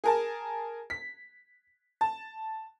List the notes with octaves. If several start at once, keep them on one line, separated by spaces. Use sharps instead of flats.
G#4 A#4 A5
B6
A5